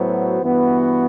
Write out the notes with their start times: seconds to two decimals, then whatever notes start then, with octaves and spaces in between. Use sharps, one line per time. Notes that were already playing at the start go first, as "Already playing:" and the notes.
Already playing: A2 F#3 B3 F#4 C5
0.42 G2 E3 B3 F#4